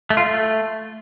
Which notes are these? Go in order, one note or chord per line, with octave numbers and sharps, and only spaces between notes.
A3
F4
A3